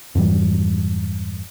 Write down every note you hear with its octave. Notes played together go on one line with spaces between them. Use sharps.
F2 G#2 E3 G3